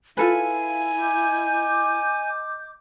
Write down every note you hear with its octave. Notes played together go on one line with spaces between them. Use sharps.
E4 F4 A4 B4 F5 G#5
D#5 D6 G6